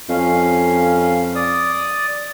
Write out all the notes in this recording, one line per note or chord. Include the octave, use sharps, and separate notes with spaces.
F2 C#4 F5
D5 D#6